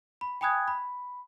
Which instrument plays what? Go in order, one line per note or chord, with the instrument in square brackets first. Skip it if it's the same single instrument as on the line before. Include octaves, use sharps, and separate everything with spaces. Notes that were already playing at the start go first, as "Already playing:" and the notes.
[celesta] B5
G5 G#5 B5 D#6 F#6 G#6
B5